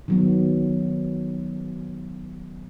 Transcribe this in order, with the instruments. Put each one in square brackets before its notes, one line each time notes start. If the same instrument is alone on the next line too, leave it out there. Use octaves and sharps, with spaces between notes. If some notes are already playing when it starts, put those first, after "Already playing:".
[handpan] D#3 F#3 B3